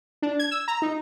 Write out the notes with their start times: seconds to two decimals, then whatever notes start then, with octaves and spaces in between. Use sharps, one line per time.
0.22 D4
0.39 G#6
0.51 E6
0.68 A#5
0.82 D#4